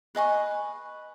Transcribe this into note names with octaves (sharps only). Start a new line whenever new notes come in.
B4 D#5 G#5 C#6